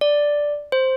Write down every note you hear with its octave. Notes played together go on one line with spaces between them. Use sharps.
D5
C5